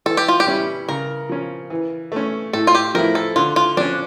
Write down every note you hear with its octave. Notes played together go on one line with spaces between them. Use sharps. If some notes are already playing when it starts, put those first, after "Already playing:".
E3 A4
G4
F4
G4
G3 C#4 E4
C#3 A#4
F3 C#4
E3
A3 C#4
A2 A4
F4
G4
F3 A3 E4 A#4
A4
D3 F4
F4
F3 C#4 D4